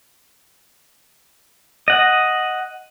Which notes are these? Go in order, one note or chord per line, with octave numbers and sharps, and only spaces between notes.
D#5 F#5